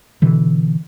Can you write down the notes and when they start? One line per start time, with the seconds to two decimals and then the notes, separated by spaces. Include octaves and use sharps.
0.22 B2 D3 E3